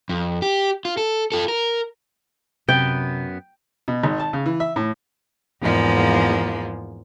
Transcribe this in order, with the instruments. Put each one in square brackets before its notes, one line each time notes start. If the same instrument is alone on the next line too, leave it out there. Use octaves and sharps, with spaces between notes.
[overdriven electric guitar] F2
G4
F4
A4
F4 A4
A#4
[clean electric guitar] F#2 B3 [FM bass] C3 [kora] G5
[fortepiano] B2
G#1
A5
C#3
E3
E5
A2
[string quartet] E2 G#2 F3 G#3 A#3